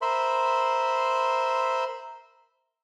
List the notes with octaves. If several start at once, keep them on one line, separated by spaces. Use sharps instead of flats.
A#4 C5 E5 B5 C6